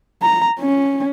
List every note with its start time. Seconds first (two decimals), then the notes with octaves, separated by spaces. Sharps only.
0.22 A#5
0.60 C#4